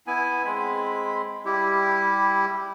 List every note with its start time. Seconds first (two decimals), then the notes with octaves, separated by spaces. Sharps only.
0.07 B3 E4 G#5
0.45 G#3 C4 B5
1.45 G3 E4 G4